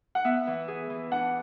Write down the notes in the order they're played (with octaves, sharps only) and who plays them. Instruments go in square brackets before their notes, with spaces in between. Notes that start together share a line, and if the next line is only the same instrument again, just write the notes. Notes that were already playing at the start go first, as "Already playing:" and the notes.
[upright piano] F#5
[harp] B3 [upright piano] E5
[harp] E3
G#4
E3
[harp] D4 [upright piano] F#5